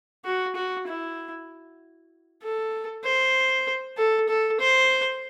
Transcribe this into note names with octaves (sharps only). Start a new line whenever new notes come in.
F#4
F#4
E4
A4
C5
A4
A4
C5